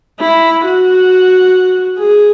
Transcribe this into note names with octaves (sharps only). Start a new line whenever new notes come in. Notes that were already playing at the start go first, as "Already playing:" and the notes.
E4
F#4
G#4